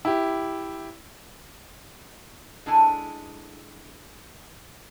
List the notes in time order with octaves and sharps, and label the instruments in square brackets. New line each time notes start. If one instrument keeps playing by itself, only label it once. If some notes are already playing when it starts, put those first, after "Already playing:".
[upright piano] E4 G4
[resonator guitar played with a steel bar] G#3 D4 E4 A4 G#5